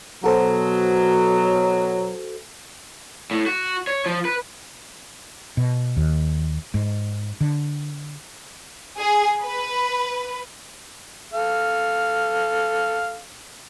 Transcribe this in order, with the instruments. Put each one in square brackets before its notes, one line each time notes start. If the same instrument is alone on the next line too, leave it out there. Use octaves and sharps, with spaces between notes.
[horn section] B2 F#3 [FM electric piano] F#4 A4 C5
[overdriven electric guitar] A2
F#4
C#5
F3
B4
[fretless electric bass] B2
D#2
G#2
D3
[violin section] G#4
B4
[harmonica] A4 F5